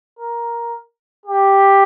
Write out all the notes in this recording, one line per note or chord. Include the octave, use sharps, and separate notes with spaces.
A#4
G4